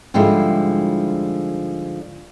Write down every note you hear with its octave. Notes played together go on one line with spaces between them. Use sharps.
G#2 D3 F3 G3 G#3 E4